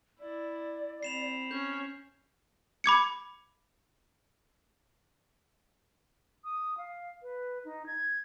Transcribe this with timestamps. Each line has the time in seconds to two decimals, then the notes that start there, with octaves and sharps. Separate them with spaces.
0.20 E4 D5
1.03 C4 B5 C7 E7 F7
1.51 C#4 G6
2.84 B5 D6 G#6 C#7
6.44 D#6
6.78 F5
7.23 B4
7.65 D#4
7.86 G#6